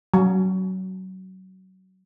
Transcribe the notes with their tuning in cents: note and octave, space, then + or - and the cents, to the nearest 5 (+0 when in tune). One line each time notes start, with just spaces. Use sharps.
F#3 +20